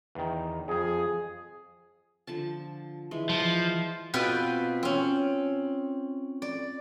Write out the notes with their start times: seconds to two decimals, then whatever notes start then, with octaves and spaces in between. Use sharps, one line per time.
0.15 E2 D#3
0.68 F2 F3 G#4
2.27 D3 F3 A5
3.11 E3 G#3
3.29 F3
4.14 B2 C4 F4 B4 G5
4.83 C4 C#4
6.42 D5